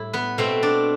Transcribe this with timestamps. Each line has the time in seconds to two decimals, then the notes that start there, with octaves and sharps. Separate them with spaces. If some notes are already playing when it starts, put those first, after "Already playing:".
Already playing: A2 G3 E4
0.13 B3 B4
0.38 B2 A3 C4
0.63 D4 D5